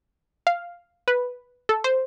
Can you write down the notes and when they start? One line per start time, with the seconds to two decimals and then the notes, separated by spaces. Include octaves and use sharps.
0.47 F5
1.08 B4
1.69 A4
1.84 C5